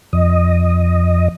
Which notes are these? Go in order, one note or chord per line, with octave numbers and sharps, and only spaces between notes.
F2 D#5